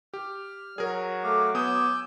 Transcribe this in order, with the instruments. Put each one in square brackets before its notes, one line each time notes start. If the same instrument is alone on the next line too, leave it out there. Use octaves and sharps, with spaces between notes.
[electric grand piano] G4 [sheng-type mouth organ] F6
[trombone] F#3 [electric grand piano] G#4 A#4
[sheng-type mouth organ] A3 F5 [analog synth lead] D6
[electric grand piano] B3 D#6 [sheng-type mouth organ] G#5 E6 G6